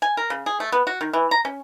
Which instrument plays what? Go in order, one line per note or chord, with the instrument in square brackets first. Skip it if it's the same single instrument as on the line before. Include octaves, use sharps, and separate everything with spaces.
[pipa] G#5
A#4
C#3
G#4
A3
B3
F#4
D#3
E3
A#5
C#4